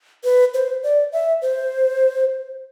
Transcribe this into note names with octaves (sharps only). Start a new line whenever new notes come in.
B4
C5
D5
E5
C5